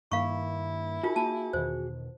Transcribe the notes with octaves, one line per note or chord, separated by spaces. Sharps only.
G2 D#3 A#3 E4 F5 C#6
D#4 F4 F#4 G#4 A#4
A#3 A5
E2 B2 D#3 C5